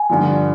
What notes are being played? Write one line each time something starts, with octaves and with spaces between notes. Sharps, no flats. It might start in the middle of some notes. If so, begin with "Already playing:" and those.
Already playing: G#5
G2 D3 F3